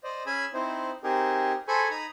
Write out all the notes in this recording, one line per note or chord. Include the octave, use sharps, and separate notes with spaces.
C5 D5 D#5
C#4 G#4 G#5 B5 E6
C4 D#4 E4 C5
C4 D#4 G4 G#4 A#4
G#4 A4 C5 G#5 B5 C#6
D#4 A#5 B5 D#6